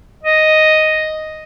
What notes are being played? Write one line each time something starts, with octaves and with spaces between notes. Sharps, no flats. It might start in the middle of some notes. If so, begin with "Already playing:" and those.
D#5